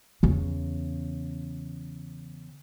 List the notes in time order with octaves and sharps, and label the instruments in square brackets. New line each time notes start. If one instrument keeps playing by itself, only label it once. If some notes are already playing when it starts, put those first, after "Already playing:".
[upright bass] E2 C#3